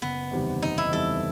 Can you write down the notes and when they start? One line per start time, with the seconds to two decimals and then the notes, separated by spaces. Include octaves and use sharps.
0.02 F#1 B3
0.31 E2 C3 D#3 G3
0.62 F#1 D#4
0.78 E4
0.92 E2 C3 D#3 G3 A4